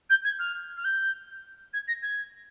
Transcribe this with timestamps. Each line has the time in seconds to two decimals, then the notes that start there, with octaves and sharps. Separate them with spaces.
0.09 G6
0.24 G#6
0.39 F6
0.77 F6
0.84 G6
1.73 G#6
1.87 A#6
2.02 G#6